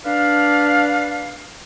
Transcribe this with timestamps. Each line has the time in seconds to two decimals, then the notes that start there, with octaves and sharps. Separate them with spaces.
0.05 D4 B4 F5